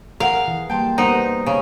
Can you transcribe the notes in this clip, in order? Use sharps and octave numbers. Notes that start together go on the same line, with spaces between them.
G#4 A#4 F5 F#5
E3
G3 A#3 G5 A5 C6
G3 B3 D#4 A#4 C5 F#5 C6
C#3